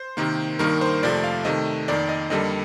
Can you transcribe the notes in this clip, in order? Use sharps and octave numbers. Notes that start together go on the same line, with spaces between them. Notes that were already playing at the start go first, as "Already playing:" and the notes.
Already playing: C5
C3 D#3 A#3
G2 D#3 A#3 A#4
C5
F2 C3 F3 A3 D5
F5
C3 D#3 A3 D#5
F2 D#3 A#3 D5
D#5
F2 D3 G3 A#3 D#5